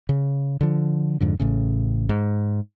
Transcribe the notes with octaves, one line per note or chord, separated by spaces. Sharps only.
C#3
D3 F3
F2 G#2 D3
A1 A2 C#3
G#2